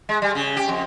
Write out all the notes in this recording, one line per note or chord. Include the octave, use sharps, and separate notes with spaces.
G#3
G3
C#3
G4
F2